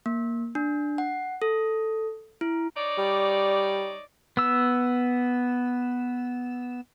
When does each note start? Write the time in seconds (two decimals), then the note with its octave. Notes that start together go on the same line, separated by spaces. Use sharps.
0.06 A#3
0.55 D4
0.98 F#5
1.42 A4
2.41 E4
2.76 D#4 C#5 D5
2.98 G3
4.37 B3 E6